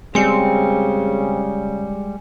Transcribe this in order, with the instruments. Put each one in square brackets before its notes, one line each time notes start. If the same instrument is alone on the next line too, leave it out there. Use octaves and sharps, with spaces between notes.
[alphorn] C#3 [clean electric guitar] G3 G#3 [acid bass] C4 [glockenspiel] G#5 C#7